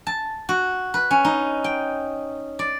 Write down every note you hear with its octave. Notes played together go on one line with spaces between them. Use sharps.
A5
F#4
B4
C#4
D#4
G5
D5